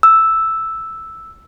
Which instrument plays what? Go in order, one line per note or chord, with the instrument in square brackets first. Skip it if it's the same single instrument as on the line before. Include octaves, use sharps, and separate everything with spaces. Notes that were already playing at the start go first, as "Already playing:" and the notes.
[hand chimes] E6